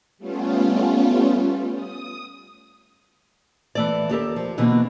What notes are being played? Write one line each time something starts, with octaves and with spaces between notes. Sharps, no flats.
G3 A3 B3 C#4 F4
D#6
E3 A3 D5
D#2 G4 A4 A#4
F3
B2 D3 E3 A#3